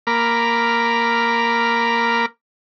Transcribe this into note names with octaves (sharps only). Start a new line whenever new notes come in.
A#3 A#4 B5 D6 F6